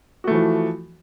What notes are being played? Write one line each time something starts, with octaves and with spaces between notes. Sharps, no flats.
E3 F3 A3 F#4